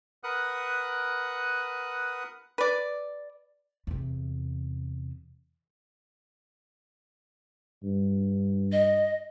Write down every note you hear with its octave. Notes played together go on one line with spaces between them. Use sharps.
A#4 B4 F#5 D#6 F#6
B4 D5
E2 C3
G2
D#5